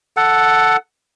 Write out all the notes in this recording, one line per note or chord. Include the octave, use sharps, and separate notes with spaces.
A4 F#5